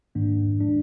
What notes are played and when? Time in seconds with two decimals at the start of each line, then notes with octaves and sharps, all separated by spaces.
0.15 G#2 D#3 A#3 D4
0.59 F3 G#3 D4